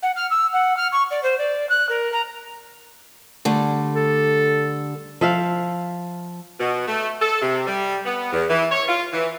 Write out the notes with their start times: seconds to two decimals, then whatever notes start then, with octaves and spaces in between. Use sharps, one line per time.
0.02 F#5
0.16 F6
0.30 E6
0.53 F#5
0.77 F6
0.92 C#6
1.10 D5
1.23 C5
1.38 D5
1.69 F#6
1.89 A#4
2.12 A#5
3.45 D3 G3 A3
3.96 A4
5.21 F3 E5 F5
6.60 B2
6.88 A3
7.21 A4
7.42 C3
7.67 G3
8.05 B3
8.33 E2
8.49 E3
8.72 C#5
8.88 F4
9.13 E3